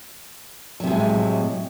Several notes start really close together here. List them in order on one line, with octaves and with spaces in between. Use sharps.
F#3 C3 A2 G#3